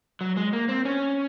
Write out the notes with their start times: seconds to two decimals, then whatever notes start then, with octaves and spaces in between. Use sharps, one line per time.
0.21 F#3
0.37 G#3
0.53 A#3
0.69 C4
0.85 C#4